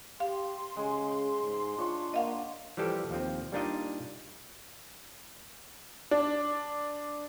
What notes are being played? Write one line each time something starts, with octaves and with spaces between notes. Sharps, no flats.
G4 F5 C6
C#3 G#3
G#2
D4 F4 C#5 C#6
A#3 D#5 F5 F#5
E3 F3 G3 G4 A4
D#2 F3 C4
G3 A#3 D4 D#4 F4 D#5
D4